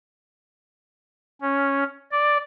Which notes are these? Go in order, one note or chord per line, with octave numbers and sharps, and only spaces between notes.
C#4
D5